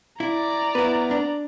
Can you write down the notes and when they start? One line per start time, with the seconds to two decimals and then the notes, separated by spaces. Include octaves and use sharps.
0.20 E4 D5 A#5
0.75 B3 E4 B4
1.11 D4